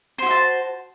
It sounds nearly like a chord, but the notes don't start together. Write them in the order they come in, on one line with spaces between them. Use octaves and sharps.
C5 F#4 E5 A5